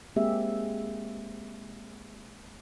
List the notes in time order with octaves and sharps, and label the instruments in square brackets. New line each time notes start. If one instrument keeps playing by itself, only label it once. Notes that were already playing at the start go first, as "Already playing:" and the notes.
[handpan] G#3 A#3 C4 G4 G#4 E5